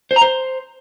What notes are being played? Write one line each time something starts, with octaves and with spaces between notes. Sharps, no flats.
C5
A#5
C5